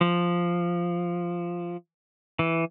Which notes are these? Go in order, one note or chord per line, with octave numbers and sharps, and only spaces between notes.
F3
E3